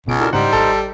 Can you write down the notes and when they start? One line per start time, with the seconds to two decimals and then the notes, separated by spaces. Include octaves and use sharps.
0.06 G1 C#2 B2 D7
0.21 D4 E4 F#4 A4 A#4
0.33 G#2 C#3 G3 D#4 C5 F#5
0.53 G#1 A4 F6